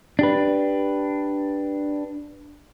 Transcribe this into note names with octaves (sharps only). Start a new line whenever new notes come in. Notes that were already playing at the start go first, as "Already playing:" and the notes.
D4 G4 B4